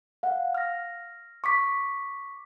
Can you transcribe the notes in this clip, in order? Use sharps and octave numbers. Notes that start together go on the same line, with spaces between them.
F5 F#5
F6 A#6
C#6 D6 B6